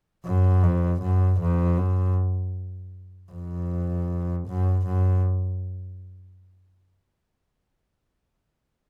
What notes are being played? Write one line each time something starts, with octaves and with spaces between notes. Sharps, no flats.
F#2
F2
F#2
F2
F#2
F2
F#2
F#2